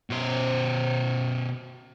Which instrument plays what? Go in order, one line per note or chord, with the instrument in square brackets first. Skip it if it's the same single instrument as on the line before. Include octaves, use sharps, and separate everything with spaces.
[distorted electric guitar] B2 C5